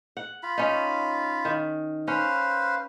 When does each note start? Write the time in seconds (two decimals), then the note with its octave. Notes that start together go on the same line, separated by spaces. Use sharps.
0.17 F#5
0.43 F4 B5
0.58 C#4 D#4
1.45 D#3
2.08 C#4 B4 C5 F5